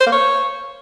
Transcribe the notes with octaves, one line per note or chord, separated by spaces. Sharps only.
C5
A#3
C#5